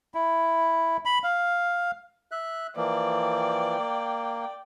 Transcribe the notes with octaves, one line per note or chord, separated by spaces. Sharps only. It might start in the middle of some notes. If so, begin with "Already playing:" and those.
E4
B5
F5
E5 F#6
E3 F3 A#3 D5 G5
A#3